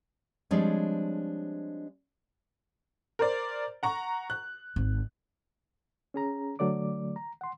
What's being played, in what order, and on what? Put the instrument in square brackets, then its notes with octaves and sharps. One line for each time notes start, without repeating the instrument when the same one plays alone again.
[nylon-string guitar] F3 G3 G#3 C4 D4 C#5
[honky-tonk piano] A#4 C5 D5
F#5 A#5 C#6
F#6
[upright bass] G#1
[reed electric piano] C#4 G#4 A#5
D3 F#3 A3 D5 D6
A#5
F#5 C6